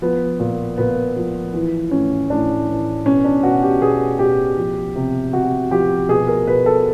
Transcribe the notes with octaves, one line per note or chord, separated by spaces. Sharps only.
F3 B3
A#2
A#2 B3
F3
E3
A2 C#4
A2 D4
E3
B2 C#4
D4
B2 F#4
G4
B2 G#4
B2 G4
F3
C3
C3 F#4
F3 G4
B2 G#4
A#4
B2 B4
A4